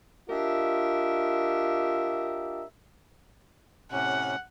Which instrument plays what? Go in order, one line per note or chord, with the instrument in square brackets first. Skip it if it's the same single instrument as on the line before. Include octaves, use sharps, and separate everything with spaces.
[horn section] D4 F4 G4 A#4 D#5 E5
[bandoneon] A2 C3 C#4 [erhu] F#5